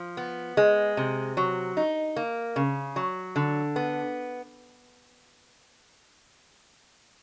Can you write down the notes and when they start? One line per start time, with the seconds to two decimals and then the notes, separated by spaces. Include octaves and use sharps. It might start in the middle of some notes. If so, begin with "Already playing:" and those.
Already playing: F3
0.17 B3
0.57 G#3
0.97 C3
1.37 F#3
1.77 D#4
2.16 A#3
2.56 C#3
2.96 F#3
3.36 D3
3.76 B3